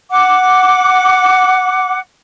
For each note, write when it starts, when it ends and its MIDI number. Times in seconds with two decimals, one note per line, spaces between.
0.10 1.99 78
0.10 1.99 86